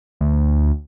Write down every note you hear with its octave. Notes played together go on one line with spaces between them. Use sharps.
D2